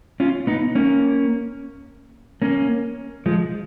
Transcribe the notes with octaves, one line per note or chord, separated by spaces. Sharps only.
C#4 F4
B3 D#4
A#3 C#4
A#3 C#4
F3 G#3